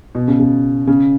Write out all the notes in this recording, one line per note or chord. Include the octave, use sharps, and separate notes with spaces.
B2
C#3
C#3
C#3